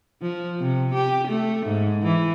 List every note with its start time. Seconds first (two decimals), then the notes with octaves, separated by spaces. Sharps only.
0.22 F3
0.60 C3
0.94 G4
1.28 A3
1.66 G#2
2.03 E3